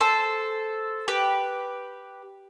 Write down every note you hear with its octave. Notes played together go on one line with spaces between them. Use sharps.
A4 C5
G4 B4